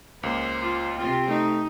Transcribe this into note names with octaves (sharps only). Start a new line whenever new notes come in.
C#2 A#3 C5
F4
C3 C4 F4 G5
A3 D#4